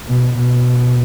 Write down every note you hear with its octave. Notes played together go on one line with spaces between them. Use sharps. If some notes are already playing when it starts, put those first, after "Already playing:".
B2
B2